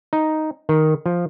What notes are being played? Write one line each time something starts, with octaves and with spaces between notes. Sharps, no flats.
D#4
D#3
F3